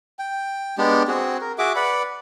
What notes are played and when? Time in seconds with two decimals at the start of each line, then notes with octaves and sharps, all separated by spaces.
0.19 G5
0.78 G#3 B3 D4 G4
1.08 C4 F#4 G#4
1.41 A#4
1.58 F#4 G#4 E5 D6
1.76 B4 D5 F#5 B5